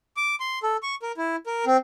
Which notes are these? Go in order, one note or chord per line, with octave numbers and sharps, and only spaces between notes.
D6
C6
A4
C#6
A#4
E4
A#4
C4